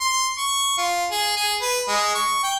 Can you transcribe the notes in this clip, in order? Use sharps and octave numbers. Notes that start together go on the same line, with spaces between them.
C6
C#6
F4
G#4
G#4
B4
G#3
C#6
G5